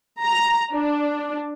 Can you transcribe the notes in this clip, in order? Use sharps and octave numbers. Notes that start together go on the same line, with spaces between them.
A#5
D4